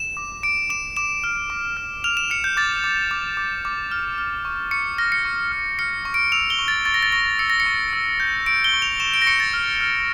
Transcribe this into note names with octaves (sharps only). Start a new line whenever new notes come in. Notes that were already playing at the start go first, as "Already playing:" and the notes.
Already playing: E7
D6
D6 D7
D6 E7
D6 E7
F6
D6
F6
F6 F7
E7
F6 C#7
G6
D6 A6
D6
D6
D6
D6
F6
F6
C#6
C#6 C#7
F6 A#6
C#7
C#6
F6
F6 C#7
C#6
D7
E6 F7
G7
C#6
A6
C#6 A6
A#6
A6
C#6 A#6
E6 C#7
A#6
C#7
C#6
E6
G6
C#6 D7
G7
C#6
F7
C#6 E7
D7
A#6
C#6 C#7
A6
F6
F6